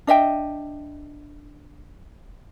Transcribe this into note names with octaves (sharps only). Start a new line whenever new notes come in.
D4 D#5 E5 G5